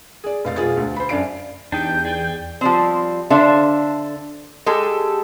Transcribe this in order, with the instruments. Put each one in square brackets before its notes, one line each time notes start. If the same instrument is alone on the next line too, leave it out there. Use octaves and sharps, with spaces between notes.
[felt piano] G#4 D5
F1 F5 A6
E1 F4 G#4 A6
D2
C5 B5
F#2 D4 D5 F5 C7 D7
[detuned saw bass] E2 [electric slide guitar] D4 D#4 G4 [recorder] G5 [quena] G6
[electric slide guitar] G#4 D5
[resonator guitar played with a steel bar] F3 G3 C4
D3 D4 A4 C5 E5 F5
G#3 G4 A4